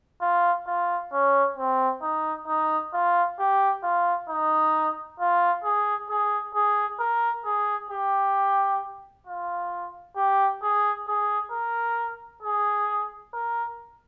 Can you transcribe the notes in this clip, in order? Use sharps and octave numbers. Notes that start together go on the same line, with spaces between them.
F4
F4
C#4
C4
D#4
D#4
F4
G4
F4
D#4
F4
G#4
G#4
G#4
A#4
G#4
G4
F4
G4
G#4
G#4
A#4
G#4
A#4